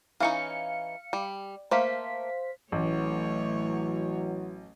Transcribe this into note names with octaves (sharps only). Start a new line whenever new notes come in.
E3 C#4 D#4 F5 C#7
G3
A3 A#3 C5 F5 B6
A1 A2 E3 F#3 A3 C#5